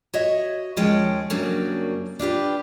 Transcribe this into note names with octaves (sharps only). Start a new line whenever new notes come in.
F#4 C#5 D#5 E5
D#2 F3 G#3 C#4 C#5 G5
F#2 C#3 F#3 G3 A#3 D4
D4 F4 G4 B4